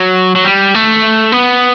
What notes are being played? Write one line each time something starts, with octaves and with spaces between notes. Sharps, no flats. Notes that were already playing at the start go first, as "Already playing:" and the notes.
Already playing: F#3
F#3
G3
A3
B3